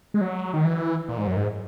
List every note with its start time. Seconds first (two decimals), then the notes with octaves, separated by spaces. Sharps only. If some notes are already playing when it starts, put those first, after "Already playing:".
0.14 G#3
0.21 F#3
0.53 D#3
0.65 E3
1.08 A#2
1.18 G#2
1.27 F#2
1.37 G#2